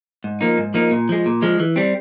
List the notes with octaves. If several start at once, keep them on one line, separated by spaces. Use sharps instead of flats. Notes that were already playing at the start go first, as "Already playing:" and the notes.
G#2
F3 A#3 D#4
G#2
F3 A#3 D#4
A#2
F3 G#3
A#2
F3 G#3
E3
G3 C4